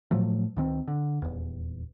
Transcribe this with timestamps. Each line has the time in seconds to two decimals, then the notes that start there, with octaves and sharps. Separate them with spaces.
0.11 A2 F3 F#3 A3
0.56 C#2 D#3 C4
0.88 D3
1.22 D#1 E2